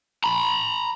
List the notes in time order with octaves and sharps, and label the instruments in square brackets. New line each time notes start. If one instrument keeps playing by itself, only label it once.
[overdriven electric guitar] A#5 B5